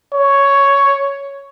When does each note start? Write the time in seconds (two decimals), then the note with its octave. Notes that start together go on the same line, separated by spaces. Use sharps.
0.15 C#5